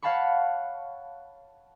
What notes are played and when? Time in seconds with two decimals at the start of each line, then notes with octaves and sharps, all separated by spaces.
0.02 C#5 F5 F#5 A5 B5 C#6